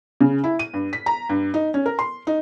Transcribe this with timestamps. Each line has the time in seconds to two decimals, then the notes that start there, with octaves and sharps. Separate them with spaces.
0.21 C#3
0.44 E4
0.59 D#7
0.73 G2
0.93 B6
1.06 A#5
1.29 G2
1.54 D#4
1.74 C#4
1.86 A#4
1.99 C6
2.27 D#4